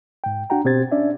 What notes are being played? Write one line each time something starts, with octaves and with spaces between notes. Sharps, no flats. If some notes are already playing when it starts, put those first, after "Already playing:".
G#2 G5
D4 F#4 F#5 G5 A#5
B2 C4 G4 C5 G#6 A6
C#4 D4 D5 E5